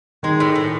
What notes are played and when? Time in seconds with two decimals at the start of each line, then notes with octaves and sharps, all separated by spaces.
0.23 D#3 G#3
0.40 A2
0.56 A2